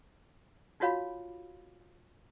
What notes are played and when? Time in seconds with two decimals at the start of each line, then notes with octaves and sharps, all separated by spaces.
0.80 D#4 F4 F#4 C#5 F5 B5